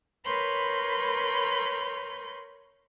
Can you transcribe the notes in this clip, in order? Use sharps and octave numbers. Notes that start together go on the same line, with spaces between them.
A#4 B4 C#5 B5 C6 G6